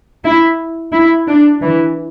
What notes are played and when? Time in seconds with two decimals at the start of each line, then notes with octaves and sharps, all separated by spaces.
0.24 E4
0.93 E4
1.28 D4
1.62 E3